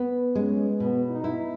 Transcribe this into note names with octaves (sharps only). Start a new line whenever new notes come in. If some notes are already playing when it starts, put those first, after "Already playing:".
Already playing: B3
G#3 C#4
B2 B3
D#4
E4